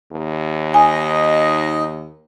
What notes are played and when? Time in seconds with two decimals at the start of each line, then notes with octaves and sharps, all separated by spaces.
0.12 D#2
0.74 D#4 D#5 G#5